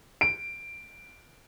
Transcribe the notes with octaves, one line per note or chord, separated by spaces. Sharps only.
D7